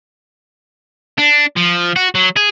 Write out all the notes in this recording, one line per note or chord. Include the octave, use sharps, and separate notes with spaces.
D4
F3
F#4
F#3
G#4